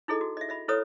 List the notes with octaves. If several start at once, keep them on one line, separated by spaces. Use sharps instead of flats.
D#4 E4 G#4 A4 D#5
F#4
D#5 E5
D#5 E5 B5
E4 A4 B4 C#5 D5 D#6